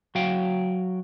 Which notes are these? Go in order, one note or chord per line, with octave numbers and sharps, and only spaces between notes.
F#3 F#4 F5 G5